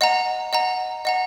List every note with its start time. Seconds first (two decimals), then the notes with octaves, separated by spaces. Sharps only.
0.01 D#5 F#5 A#5
0.53 D#5 F#5 A#5
1.05 D#5 F#5 A#5